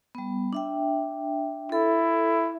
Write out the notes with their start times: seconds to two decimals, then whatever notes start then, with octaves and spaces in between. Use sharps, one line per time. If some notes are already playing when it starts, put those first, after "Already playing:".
0.15 G3 B3
0.53 D4 E5 G5
1.72 E4 A4